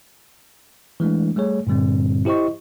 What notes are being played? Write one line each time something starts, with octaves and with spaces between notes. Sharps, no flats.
E3 G#3 A3 D4
G3 A3 G#4 C#5
G2 A#2 D3 G3 C4
E4 G4 C5 D#5 C#6